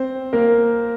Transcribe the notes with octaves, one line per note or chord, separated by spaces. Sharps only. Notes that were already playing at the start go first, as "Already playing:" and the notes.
Already playing: C4 C5
A#3 A#4